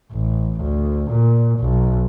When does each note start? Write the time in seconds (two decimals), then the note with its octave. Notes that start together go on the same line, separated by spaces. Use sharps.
0.12 A1
0.61 D2
1.11 A#2
1.60 B1